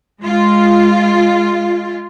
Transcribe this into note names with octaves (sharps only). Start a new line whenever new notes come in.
G#3 F4